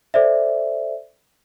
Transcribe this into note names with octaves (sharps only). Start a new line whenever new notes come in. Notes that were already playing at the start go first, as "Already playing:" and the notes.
A4 C5 D5 E5